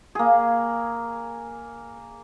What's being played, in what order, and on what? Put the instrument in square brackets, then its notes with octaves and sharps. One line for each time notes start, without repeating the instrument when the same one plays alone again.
[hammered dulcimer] A#3 G#4